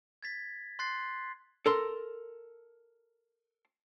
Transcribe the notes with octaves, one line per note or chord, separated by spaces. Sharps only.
G#6 A6 B6
C6 F#6 A6 C7
A4 A#4 C6